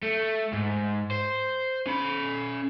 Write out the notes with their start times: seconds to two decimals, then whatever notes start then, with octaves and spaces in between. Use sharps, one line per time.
0.03 A3
0.53 G#2
1.11 C5
1.86 C#4 B5